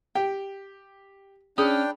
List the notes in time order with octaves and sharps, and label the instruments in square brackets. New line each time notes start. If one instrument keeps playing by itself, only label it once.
[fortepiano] G4 [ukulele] G5
[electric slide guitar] C#4 [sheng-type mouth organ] D4 G5 [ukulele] G#4 B5 [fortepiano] D#6